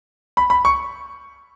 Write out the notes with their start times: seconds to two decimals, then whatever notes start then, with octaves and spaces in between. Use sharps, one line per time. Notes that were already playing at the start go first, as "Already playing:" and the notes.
0.37 B5
0.50 B5
0.65 C#6